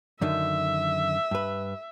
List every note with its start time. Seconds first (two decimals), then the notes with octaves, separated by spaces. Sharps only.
0.21 F#2 D3 D#3 E5
1.31 G2 B4